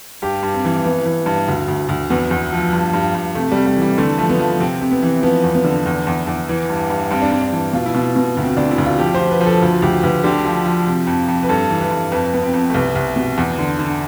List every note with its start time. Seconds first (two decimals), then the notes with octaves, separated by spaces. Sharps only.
0.22 G2 G4
0.43 G2
0.54 C4
0.65 E3
0.84 E3 B3
1.06 E3
1.26 G2
1.48 D2
1.68 D2
1.89 D2
2.10 E2 B3
2.31 E2
2.52 F3
2.73 G2
2.93 G2
3.15 G2
3.35 C3 A3
3.52 C3 G3
3.66 G3
3.76 E3
3.82 G3
3.98 D3 A3
4.18 F3 A3
4.29 B3
4.39 F3
4.60 C3 C4
4.81 C3
4.91 B3
5.03 E3
5.23 F3 B3
5.43 E2
5.55 B3
5.64 D3
5.86 E2
6.07 E2
6.27 E2
6.49 E3
6.69 G2
6.90 G2
7.11 G2 C4
7.22 D4
7.31 G2 C4
7.42 D4
7.52 E3
7.73 B2 F4
7.86 E4
7.94 B2 F4
8.16 B2
8.37 D2
8.43 C4
8.57 D2 D4
8.71 E4
8.78 D2
8.85 F4
8.99 F3 G4
9.14 C5
9.20 F3
9.31 B4
9.41 F3
9.46 A4
9.62 D2 F4
9.82 D2 G4
10.03 D2 B4
10.24 D3 G4
10.45 F3
10.65 F3
10.87 C3
11.07 F2
11.28 F2
11.43 B4
11.49 G2 A4
11.70 E3
11.81 B4
11.91 G2
12.12 F2 B4
12.33 F2 B3
12.43 C4
12.54 F2
12.70 A3
12.74 C2 B3
12.95 C2
13.16 B2
13.38 E2
13.59 D3
13.79 D3